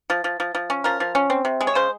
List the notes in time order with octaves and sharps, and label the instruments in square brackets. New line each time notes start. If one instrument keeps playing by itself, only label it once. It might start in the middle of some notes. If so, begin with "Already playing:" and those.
[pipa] F3
F3
F3
F3
C#4
F3 A#4
F3
C#4
C4
C3
G#3
C#5
C#3 C5